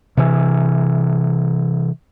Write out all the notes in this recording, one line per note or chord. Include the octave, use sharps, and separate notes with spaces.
C3 E3